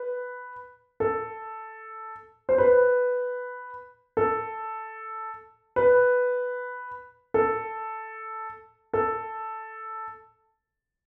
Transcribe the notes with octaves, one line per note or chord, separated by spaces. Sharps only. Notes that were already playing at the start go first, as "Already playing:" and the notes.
Already playing: B4
A4
C5
B4
A4
B4
A4
A4